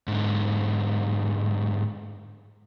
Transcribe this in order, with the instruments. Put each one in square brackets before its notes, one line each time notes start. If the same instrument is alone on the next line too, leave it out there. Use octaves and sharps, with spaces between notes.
[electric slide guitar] G#2 D3